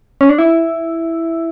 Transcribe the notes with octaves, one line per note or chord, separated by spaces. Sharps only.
C#4
D4
E4